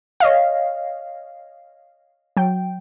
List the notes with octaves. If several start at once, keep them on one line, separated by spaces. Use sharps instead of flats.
C#5 D#5 F5
F#3 G5